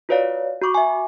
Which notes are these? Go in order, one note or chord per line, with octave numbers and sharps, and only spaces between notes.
F4 F#4 B4 C#5 D5 F5
F#4 B5 C#6 D6
E5 G#5